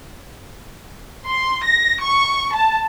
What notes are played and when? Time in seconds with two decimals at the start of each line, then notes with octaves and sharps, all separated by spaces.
1.28 C6
1.65 A#6
2.03 C#6
2.56 A5